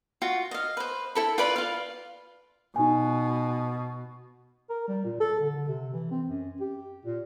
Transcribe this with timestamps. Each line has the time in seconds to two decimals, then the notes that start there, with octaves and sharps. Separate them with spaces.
0.22 F4 F#4
0.51 D#5 F5
0.77 B4 C5
1.15 E4 A4 B5
1.38 F4 B4 D5 B5
1.56 F4 F5
2.76 B2 D#4 G#5
4.70 A#4
4.88 G3
5.05 A#2
5.20 A4
5.40 D3
5.55 D3
5.68 C3
5.93 E3
6.11 C4
6.27 F#2
6.61 G4
7.05 A#2